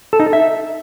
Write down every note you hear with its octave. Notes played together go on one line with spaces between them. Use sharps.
A4
D#4
A4
E5